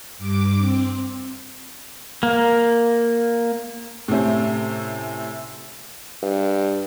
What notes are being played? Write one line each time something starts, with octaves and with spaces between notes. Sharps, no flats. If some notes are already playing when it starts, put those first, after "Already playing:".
G2 D6
C4
A#3
A2 C3 A3 C4 C#4
G2